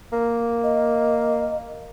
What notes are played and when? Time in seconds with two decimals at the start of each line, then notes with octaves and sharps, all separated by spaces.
0.12 A#3
0.63 D#5